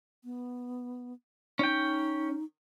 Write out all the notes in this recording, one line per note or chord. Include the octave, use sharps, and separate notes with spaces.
B3
C#4 D#4 G5